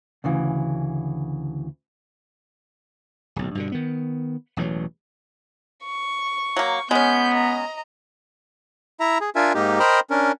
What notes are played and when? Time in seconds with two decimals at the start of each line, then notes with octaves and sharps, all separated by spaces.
0.24 D2 C#3 E3
3.36 D1 B1
3.55 G2 B2 D3
3.72 D#3 B3
4.57 E1 A1 E3 F#3
5.84 C#6
6.56 F#3 A#3
6.91 G#3 B3 C#4 G6
7.32 D#5 A#5
9.00 E4 E5 A#5
9.21 G#4
9.36 D4 F4 A#4 E5 G#5
9.55 G#2 A#3 D#4 G4
9.80 A#4 C5 D#5 G5 A#5 B5
10.10 C#4 D4 A#4